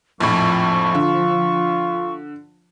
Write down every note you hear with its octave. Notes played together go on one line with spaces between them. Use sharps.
A#1 F2 A2 F3 C#6
D3 F4